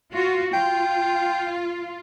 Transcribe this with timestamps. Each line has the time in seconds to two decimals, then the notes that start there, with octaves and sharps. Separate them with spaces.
0.13 F4 F#4
0.53 F4 G5